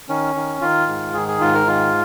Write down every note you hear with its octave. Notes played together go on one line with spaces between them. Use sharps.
D#3 C#4
D#3
D#3 F4
G#2
D#3 G#4
G#4
G#2 F4
A#4
D#3 F4